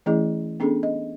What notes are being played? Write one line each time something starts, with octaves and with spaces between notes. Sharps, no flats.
E3 A3 C#4 E4 G#4 D#5
B3 C#4 D4 G#4 A4
D#5